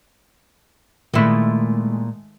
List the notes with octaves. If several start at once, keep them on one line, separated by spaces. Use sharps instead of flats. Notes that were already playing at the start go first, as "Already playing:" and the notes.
A#2 D#3 G#3 A3 E4